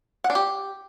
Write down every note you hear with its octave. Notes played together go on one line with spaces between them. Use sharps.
F#5
D4
G4